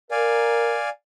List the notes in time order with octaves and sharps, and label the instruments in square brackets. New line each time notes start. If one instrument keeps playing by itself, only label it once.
[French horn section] A#4 [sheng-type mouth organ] D5 F5 G#5